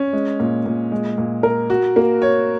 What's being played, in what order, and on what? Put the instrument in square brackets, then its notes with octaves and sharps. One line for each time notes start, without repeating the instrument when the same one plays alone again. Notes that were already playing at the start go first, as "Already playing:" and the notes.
Already playing: [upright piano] C#4
G#3
A#2
A#2
G#3
A#2
A#4
F#4
A#3
C#5